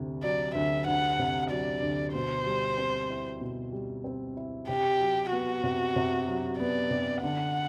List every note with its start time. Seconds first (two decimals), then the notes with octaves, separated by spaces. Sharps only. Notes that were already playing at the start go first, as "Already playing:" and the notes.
Already playing: D2 C3
0.23 F#3 D5
0.55 D2 E5
0.87 D2 F#5
1.19 C3
1.50 F#3 D5
1.83 D2
2.13 B2 C5
2.46 G3
2.78 C4
3.10 E4
3.41 B2
3.72 G3
4.04 C4
4.37 E4
4.69 C3 G4
5.00 F#3
5.31 B3 F#4
5.64 C3
5.96 C3
6.27 F#3
6.59 B3 D5
6.91 C3
7.23 D3 F#5